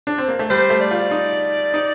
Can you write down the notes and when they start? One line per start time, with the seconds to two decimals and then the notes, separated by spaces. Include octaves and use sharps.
0.07 D4
0.18 C4
0.28 A#3
0.39 A3
0.50 G3 C5
0.70 A3
0.81 D5
0.91 F4
1.11 D#4
1.74 D#4